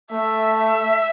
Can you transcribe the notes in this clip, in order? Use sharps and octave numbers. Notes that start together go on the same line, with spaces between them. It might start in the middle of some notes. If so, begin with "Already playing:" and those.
A3 E5
E5